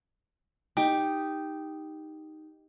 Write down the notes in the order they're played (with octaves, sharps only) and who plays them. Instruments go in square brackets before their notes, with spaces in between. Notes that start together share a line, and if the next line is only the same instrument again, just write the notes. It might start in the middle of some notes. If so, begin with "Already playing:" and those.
[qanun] D#4 [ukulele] G4